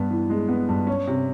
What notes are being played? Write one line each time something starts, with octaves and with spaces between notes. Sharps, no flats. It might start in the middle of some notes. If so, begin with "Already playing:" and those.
Already playing: G2 B3
E3
G#3
B3
G2
C#4
C3